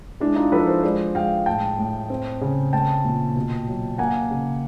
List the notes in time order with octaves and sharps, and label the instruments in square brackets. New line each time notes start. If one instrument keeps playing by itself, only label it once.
[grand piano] G#3 D4 E4
D#4 F4
F3 A4 B4
A#4 C5
G#3 C5 D5
G#3 F5 G5
A2 G5 A5
A2
C4
C#3
A3 G5 A5
A#2
B2
F#3
A#3 F#5 G#5
C#3